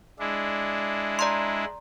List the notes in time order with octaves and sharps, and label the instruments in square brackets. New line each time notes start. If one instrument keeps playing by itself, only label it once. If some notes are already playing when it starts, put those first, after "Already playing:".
[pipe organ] G#3 D4 E4
[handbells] D5 A#5 C6